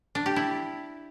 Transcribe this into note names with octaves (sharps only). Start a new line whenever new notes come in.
D4
G4
E4